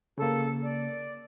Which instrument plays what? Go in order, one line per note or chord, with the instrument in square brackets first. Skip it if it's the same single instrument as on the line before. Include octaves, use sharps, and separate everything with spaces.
[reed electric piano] C#3 A#3 [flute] A4
[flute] D5